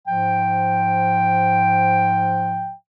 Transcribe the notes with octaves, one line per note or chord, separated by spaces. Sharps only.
G#2 F3 G5